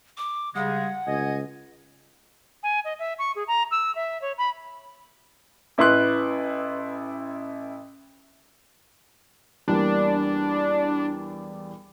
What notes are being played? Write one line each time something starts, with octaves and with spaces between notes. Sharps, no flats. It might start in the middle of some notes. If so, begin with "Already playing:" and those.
D6
C#3 G3 G#3 F#5
C#2 D#5 G#5
G#5
D#5
E5
C#6
G#4
A#5
E6
E5
C#5
B5
A1 E4 B4 C6 F#6
E2 G3 A#3 D4